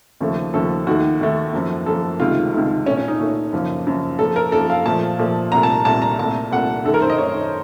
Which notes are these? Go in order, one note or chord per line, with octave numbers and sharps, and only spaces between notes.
D#2 C#3 F3 A3
D#2 C#3 F3 A3 A4
D#2 D#3 A3 F#4
D#2 D#3 A3
F#2 F3 A#3
F#2 F3 A#3 A4
C#2 C3 D#3 A3 F4
C#2 C3 D#3 A3
A#2 A3 C#4
C#4
D#4
A#2 A3
F#2 C#3 F3 A#3
F#2 C#3 F3 A#3
F#2 F3 A#3 A4
A#4
F#2 F3 A#3 A4
F5
A#2 F3 A3 A5
A#2 F3 A3
C2 A#2 A3 A#5
A5
C2 A#2 A3 A5
A#5
C2 A#2 A3 A5
C2 A#2 A3 F#5
F#2 D#3 A3 A4
A#4
C5
D#5
F#2 D#3 A3 C#5